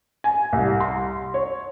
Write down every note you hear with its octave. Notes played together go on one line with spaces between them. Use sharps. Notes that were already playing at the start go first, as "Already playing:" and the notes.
G#5
C2
C6
C#5